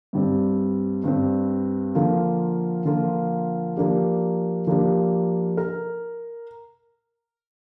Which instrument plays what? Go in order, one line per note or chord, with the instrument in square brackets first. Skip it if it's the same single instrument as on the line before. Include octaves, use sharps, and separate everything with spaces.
[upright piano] G2 G3 C4
G2 G3 C4
D3 F3 A#3 F4
D3 F3 A#3 F4
F3 A#3 D4 G4
F3 A#3 D4 G4
A#4